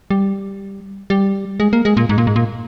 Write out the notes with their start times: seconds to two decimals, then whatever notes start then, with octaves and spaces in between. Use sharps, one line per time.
0.10 G3
1.10 G3
1.60 G#3
1.73 A#3
1.85 G#3
1.97 A#2
2.09 G#2
2.18 A#2
2.27 G#2
2.36 A#2